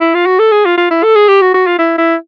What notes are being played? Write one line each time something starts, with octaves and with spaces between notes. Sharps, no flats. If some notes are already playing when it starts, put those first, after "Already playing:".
E4
F4
F#4
A4
G#4
F4
F4
E4
A4
G#4
G4
F#4
F#4
F4
E4
E4